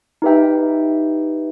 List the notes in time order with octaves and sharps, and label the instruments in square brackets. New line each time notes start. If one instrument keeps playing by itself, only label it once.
[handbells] D#4 G4 B4 E5 G5